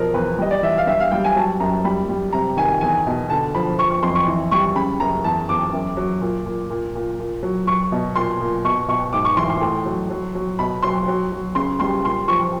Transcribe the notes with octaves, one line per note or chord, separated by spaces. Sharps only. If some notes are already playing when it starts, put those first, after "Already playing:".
Already playing: B2 F3 A#4
E2 B4
G3 D#5
D5
E3 E5
F5
G2 E5
F5
G3 G5
G#5
F#3 A5
F#2 A#5
G3 B5
G3
C3 A#5
D#3 G#5
E2 G#5
B2
D3 A5
F3 B5
F3 C#6
C#6
F2 C6
C#6
E3
G3 C#6
C#3 B5
F#2 A#5
E2 A5
E2 D6
F#2
F#3
A#2
A#2
A#2
A#2
A#2
F#3
F#3 C#6
B2
A#2 C6
A#2
B2 C#6
B2 C#6
G#2 D6
C#6
E3 C6
C6
A2
F#3
F#3
F#3
B2 B5
F#3 C6
F#3
F#3
C#3 C6
G3 C6
A#2 C6
F3 C#6